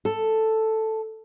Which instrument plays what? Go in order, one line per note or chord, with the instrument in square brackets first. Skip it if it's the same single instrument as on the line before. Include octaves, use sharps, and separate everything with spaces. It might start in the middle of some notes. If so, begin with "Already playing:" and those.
[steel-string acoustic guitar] A4